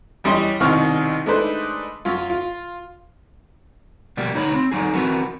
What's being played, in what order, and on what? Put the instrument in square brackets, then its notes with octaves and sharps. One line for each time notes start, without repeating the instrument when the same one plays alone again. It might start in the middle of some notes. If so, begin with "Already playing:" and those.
[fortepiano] E2 G3 C#4 D#5 C6
C2 B2 D#3 C4 C#6 F6
G#3 A3 D4 D#4 B4 C5
F#2 F4
F4
[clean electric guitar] B2 F3 G3 A#3
D2 D#4 C#5 B5
C4
D3 F#3 D#4 G#4
E3 C4 F#4 A#4 B4